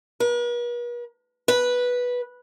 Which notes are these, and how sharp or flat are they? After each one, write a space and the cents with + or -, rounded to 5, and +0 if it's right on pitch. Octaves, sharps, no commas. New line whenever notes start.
B4 -45
B4 -10